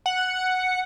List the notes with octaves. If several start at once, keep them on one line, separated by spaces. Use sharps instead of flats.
F#5